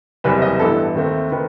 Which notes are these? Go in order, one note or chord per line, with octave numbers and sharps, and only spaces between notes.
F#1 E2 C3 E3 G3 B4
D#5
A1 G2 E3 B3 A4
D#2 D#3 A3 C4
D#3 A3 C4 B4